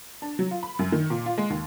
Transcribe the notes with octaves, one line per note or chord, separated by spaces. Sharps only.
D4
F#3
F4
B5
F#2
D#3
A#2
F4
G#3
D#2